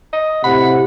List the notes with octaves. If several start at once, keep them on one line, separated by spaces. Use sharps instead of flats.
D#5
A2 C3 E4 F#5 B5